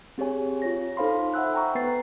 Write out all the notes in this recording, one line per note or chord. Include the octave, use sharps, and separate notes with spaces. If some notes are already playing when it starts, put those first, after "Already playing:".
C4 G4 G#4 C#5 G#5
F4 C#5 A#6
D#4 A4 C5 F5 B5 C6
E5 F#5 G#5 E6 F#6
F#5 G5 A#5 C#6
B3 B4 A#5 A6 C7